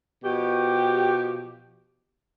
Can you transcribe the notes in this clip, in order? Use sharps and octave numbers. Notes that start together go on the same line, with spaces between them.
B2 F3 G4